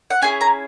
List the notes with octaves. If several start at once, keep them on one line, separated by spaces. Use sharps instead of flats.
F#5
C#4 E4 G#4 G#5
A#5